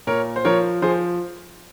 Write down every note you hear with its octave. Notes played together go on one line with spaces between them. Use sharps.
A#2 A#4 C#5
C5
F3 A#4 C#5
F3 G#4 C5